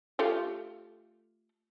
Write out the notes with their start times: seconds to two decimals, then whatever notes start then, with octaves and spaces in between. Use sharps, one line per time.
0.19 A3 F4 G4